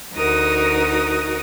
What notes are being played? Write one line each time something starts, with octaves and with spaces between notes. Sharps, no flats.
D2 D#4 F#4 A#4 D#6